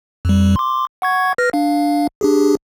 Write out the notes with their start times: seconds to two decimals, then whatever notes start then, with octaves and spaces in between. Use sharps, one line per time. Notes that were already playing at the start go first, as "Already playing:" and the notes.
0.25 F2 G3
0.56 C6 D6
1.02 F#5 C#6 G#6
1.38 B4 F6 A#6
1.53 D4 F5
2.21 D4 G4 G#4